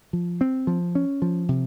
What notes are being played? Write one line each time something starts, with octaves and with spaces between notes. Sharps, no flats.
F3
C4
F3
C#4
F3
C3